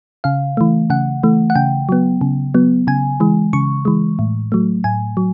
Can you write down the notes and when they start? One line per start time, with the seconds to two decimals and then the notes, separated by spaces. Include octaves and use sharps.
0.24 C#3 F5
0.57 E3 A3
0.90 C#3 F#5
1.23 E3 A3
1.50 F#5
1.55 C#3 G5
1.89 F#3 B3
2.21 C#3
2.54 F#3 B3
2.87 C#3 G#5
3.20 E3 G#3
3.53 C#3 C#6
3.85 E3 G#3
4.19 A2
4.52 F#3 A3
4.84 A2 G#5
5.17 F#3